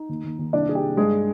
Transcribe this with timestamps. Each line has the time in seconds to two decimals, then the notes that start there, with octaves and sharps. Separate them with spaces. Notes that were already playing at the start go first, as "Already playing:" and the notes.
Already playing: D#4
0.09 D#2
0.24 D#2
0.39 D#2
0.53 C2 D4 D5
0.68 C2 G#4
0.75 G4
0.83 C2
0.97 G2 G#3 G#4